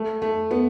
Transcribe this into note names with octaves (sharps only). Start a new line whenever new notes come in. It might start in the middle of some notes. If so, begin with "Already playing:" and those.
Already playing: A3
A3
B3